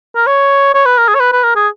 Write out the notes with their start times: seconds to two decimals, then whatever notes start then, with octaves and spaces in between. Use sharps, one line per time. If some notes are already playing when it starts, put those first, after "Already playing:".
0.15 A#4
0.27 C#5
0.74 C#5
0.85 B4
0.98 A#4
1.08 G#4
1.15 C#5
1.20 B4
1.32 B4
1.43 A#4
1.56 G#4